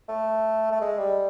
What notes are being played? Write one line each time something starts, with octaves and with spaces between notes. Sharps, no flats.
A3
A3
G#3
G3